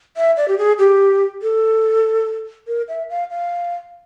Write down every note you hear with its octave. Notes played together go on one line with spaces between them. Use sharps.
E5
D5
G4
G#4
G4
A4
A#4
E5
F5
F5